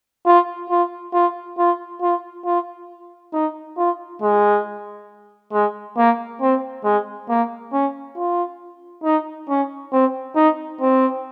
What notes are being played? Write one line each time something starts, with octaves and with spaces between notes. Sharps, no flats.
F4
F4
F4
F4
F4
F4
D#4
F4
G#3
G#3
A#3
C4
G#3
A#3
C#4
F4
D#4
C#4
C4
D#4
C4